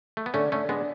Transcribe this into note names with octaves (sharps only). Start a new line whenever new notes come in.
A3
B3
D3 A3 C#4
D3 A3 C#4
G#3 B3 D4